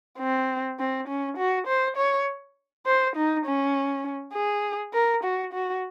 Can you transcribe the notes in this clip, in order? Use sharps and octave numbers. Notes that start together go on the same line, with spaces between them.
C4
C4
C#4
F#4
C5
C#5
C5
D#4
C#4
G#4
A#4
F#4
F#4